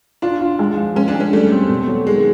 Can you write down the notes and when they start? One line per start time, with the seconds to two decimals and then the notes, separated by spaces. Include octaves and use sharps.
0.22 D4 F4
0.41 F4
0.59 G#3
0.77 F3
0.96 G#3 C#4
1.08 D4
1.15 G#3
1.20 C#4
1.33 G3 A3
1.52 C4
1.69 B2
1.88 F#3
2.07 D#3 G#3